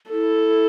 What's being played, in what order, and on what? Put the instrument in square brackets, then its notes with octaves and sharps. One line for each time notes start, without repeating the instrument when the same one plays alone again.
[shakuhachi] E4 [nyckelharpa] A4